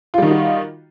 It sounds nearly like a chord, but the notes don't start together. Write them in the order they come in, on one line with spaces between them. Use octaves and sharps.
F4 G3 D#3 D#4 F#4